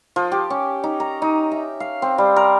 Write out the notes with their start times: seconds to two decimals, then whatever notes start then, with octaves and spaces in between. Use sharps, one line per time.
0.16 F3
0.32 G4
0.50 C#4
0.84 D#4
1.00 A#5
1.22 D#4
1.52 E5
1.80 F5
2.02 C4
2.18 G3
2.36 A#4